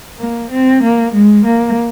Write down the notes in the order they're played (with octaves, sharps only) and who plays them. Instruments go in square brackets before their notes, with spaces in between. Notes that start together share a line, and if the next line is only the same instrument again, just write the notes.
[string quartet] A#3
C4
A#3
G#3
A#3